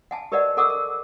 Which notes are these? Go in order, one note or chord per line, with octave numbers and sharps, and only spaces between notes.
F#5 G#5 A5
G4 A#4 B4 D5 D#5 F#5
A4 A#4 F#5 C#6 D6 E6
A#4